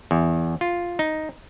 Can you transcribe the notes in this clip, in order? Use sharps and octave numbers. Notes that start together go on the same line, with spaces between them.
E2
F4
D#4